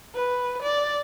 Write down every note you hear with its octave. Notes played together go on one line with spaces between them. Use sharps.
B4
D5